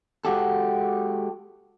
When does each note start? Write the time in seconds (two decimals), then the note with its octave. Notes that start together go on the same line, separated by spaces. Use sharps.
0.25 G#3 F#4 G4 A4